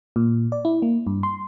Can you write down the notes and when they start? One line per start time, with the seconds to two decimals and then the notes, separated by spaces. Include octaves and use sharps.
0.16 A#2
0.52 D5
0.65 E4
0.82 A#3
1.07 G2
1.23 C6